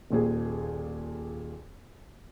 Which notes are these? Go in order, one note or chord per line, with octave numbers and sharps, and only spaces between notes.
D#1 D#2 A#2 G#4